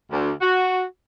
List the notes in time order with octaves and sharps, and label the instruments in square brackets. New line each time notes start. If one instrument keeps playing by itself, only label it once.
[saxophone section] D2
F#4